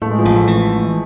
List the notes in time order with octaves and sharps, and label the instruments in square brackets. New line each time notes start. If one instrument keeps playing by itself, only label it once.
[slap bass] A2 [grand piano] A3
[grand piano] G#3
F3
[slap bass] A1
[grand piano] A3
[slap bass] E3